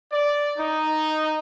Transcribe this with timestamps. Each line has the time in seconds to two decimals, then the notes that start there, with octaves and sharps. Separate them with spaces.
0.12 D5
0.57 D#4